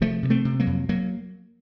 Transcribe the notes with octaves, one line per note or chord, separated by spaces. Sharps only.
C3 F3 A3
C3
A3 C4
C3
F#3 A#3
F2
F#3 A#3